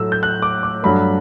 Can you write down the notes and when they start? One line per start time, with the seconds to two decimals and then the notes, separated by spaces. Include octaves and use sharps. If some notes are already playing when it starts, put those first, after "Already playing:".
Already playing: A2 F#3 A3 E6
0.12 G6
0.23 F#6
0.42 D6
0.63 D6
0.83 G2 F#3 A3 B5